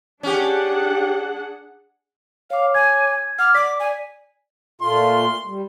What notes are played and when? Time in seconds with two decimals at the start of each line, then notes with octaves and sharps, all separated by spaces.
0.23 C#4 D4 G4 G#4 F#5
2.50 C#5 F5 D6
2.74 G#5 G#6
3.39 F#5 D6 F6
3.55 D5 D6 B6
3.80 G#5
4.81 A#2 A3 F4 C6
5.46 G3